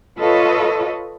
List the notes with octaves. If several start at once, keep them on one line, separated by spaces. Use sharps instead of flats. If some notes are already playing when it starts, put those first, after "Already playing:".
F4 A4 B4 C#5 D#5